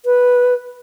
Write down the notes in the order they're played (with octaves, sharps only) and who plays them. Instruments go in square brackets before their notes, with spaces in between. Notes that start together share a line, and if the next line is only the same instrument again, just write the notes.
[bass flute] B4